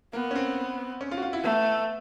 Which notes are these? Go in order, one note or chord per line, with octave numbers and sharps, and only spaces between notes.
A#3 B3
C#4
C4
C#4
F4
F#4
F4
E4
A3 B3